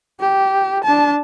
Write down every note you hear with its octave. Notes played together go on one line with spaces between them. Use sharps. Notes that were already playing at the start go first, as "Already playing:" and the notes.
G4
D4 A5